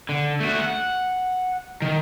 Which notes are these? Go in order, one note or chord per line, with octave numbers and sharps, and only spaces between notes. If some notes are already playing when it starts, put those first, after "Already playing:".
D3
A3 F#4
F#5
D#3